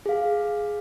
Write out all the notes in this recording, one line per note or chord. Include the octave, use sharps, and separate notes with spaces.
G#4 F5